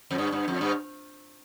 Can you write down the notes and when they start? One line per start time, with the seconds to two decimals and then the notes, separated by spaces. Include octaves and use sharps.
0.11 F2
0.18 G2
0.32 G2
0.48 F2
0.61 G2